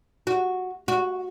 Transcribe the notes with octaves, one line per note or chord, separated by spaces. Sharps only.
F#4
F#4